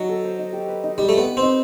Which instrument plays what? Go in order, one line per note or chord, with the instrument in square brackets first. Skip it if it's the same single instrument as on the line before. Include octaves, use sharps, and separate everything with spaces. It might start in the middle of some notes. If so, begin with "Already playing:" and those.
Already playing: [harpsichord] F#3 [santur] D#4 F#4
[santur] A4
C5
D#4
G4
B4
D#4
[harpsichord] G3 [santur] D#4
[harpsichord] A3 [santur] G4
[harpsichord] B3
[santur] B4
[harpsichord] C4
[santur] D#4